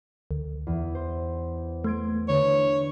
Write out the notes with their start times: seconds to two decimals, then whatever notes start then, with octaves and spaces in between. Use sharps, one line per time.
0.31 D2
0.67 E2
0.95 C5
1.84 A3 C6 G#6 D7
2.28 D3 B4 C#5